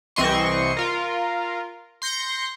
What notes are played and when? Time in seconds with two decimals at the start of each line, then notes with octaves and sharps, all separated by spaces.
0.16 C2 E3 C4 D#5 C6 C#6
0.77 F4 A#4
2.02 C6 G6 A#6 C#7